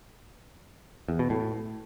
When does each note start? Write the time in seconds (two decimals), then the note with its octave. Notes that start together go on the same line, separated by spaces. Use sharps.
1.08 E2
1.19 B2
1.30 A2